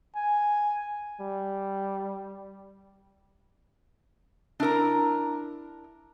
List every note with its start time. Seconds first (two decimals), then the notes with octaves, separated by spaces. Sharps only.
0.16 G#5
1.21 G3
4.60 D4 E4 A#4 A#5